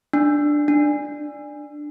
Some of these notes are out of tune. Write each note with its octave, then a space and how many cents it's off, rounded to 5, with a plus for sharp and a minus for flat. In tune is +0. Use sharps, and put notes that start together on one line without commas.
D4 +5
D4 +10